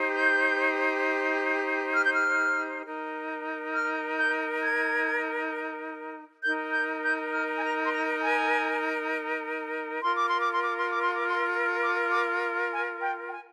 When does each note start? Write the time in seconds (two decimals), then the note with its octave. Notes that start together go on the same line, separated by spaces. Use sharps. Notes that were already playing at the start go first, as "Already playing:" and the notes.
Already playing: D#4 G4 C5
0.14 G6
1.93 F6
2.03 G6
2.14 F6
2.84 D#4 A#4
3.73 F6
4.17 G6
4.62 G#6
6.43 D#4 A#4 G6
6.73 G6
7.03 G6
7.33 F6
7.57 G#5
7.63 A#5
7.84 C6
7.92 A#5
8.22 G#5
10.03 F4 A#4 C6
10.15 D6
10.27 C6
10.39 D6
10.53 C6
10.64 D6
10.78 C6
10.90 D6
11.02 C6
11.15 D6
11.27 C6
11.81 D6
12.11 D6
12.73 G#5
13.02 G5
13.28 G5
13.32 G#5